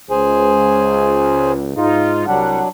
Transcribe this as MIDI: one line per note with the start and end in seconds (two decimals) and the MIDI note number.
0.10 1.70 37
0.10 1.52 68
0.10 1.52 72
0.10 1.52 80
1.76 2.25 44
1.76 2.25 63
1.76 2.25 65
2.27 2.60 36
2.27 2.69 54
2.27 2.60 55
2.27 2.69 62
2.27 2.60 78